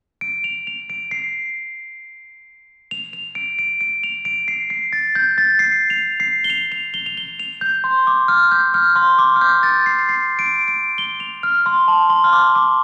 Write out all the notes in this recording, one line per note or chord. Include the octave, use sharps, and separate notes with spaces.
D7
F7
F7
D7
C7
F7
F7
D7
D7
D7
F7
D7
C7
C7
A6
G6
A6
C7
F7
C7
G7
F7
F7
G7
F7
G7
F7
G6
C6
D6
F6
G6
F6
C6
D6
F6
G6
A6
C7
C7
D7
D7
G7
F7
F6
C6
A5
C6
F6
D6
D6